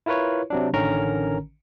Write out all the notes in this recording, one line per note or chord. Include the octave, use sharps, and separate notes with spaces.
E4 F4 A#4 B4 C#5
C3 F#3 D4
A1 D3 D#3 C#4 A#4 A#5